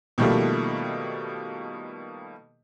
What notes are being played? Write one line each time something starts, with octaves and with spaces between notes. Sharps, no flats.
B2 D#3 F3 G3 A3 A#3